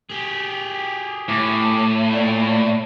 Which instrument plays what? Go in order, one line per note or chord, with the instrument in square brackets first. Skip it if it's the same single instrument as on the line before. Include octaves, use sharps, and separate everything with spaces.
[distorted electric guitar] G4 G#4
[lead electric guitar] A2 [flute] D6
[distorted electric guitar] A#2 [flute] D5